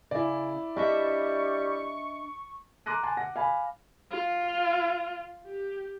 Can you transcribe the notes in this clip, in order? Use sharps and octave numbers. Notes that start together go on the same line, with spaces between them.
C#3 E4 D5
G3 D4 D#5 E5 C#6
A#5 C6 D6 F#6 A#6 D#7
G#5 A5 C6 F#6
F#5 A#6
F5 G#5 B5
F4
G4